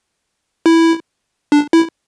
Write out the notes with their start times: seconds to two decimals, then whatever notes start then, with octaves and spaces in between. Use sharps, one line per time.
0.66 E4
1.52 D4
1.73 E4